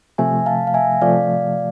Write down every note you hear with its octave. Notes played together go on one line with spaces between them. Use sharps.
C3 F3 A3 E5 G#5
F5 A5
F5
E5 G#5
C3 F3 A3 D5 F5